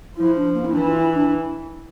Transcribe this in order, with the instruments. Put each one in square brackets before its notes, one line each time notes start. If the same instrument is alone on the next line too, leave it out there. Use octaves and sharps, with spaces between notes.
[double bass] F3 [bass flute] E4
[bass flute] D4
A#3
E4
[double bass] E3 [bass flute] D4
[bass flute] F4
E4
D4